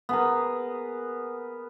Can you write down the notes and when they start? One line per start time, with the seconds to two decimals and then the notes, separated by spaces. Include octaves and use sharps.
0.09 B3 G#4 A#4